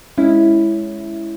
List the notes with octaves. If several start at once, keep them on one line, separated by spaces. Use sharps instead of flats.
G#3 C#4 E4